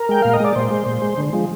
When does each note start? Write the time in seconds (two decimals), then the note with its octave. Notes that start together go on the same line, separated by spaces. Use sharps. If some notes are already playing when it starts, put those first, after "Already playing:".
Already playing: A#4
0.09 G#3 G5
0.22 A#2 F5
0.34 D#5
0.40 G#3 D5
0.56 A#2 C5
0.71 G#3
0.86 A#2
1.02 G#3
1.18 D3
1.33 F3 G#3